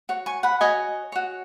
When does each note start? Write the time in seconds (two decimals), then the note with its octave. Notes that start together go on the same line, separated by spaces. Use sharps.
0.09 F#4 C#5
0.26 G#5 C#6
0.43 F#5 B5
0.61 F#4 C#5 D#5 G#5
1.12 F#4 C#5